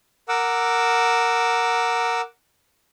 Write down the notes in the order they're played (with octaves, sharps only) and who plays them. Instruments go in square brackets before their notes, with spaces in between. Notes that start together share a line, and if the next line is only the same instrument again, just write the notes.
[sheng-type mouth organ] A#4 F#5 D6 E6